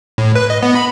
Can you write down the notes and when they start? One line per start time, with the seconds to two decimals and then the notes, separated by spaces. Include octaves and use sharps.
0.18 A2
0.35 B4
0.50 D#5
0.63 B3
0.75 B5